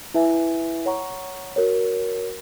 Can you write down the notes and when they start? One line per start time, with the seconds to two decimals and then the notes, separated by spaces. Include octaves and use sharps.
0.14 E4 B4 E5 G#5
0.86 C#5 F#5 A#5 C#6
1.56 F#4 A#4 C#5